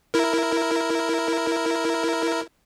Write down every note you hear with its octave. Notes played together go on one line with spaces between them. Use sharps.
E4 A#4